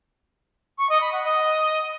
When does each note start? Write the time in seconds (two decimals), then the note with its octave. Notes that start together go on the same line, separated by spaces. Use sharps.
0.78 C#6
0.89 D#5
1.01 B5
1.12 F#5
1.24 D#5